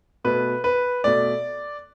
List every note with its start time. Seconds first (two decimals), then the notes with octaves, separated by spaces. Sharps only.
0.24 B2 A3 B4
0.64 B4
1.04 B2 A3 D5